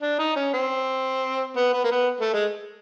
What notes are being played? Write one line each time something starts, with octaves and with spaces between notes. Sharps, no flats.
D4
D#4
C#4
C4
B3
B3
A#3
B3
A3
G#3